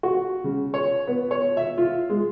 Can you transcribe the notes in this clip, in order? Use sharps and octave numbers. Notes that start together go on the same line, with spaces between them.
F#4
C#3
C#5
B3
C#5
E5
F4
G#3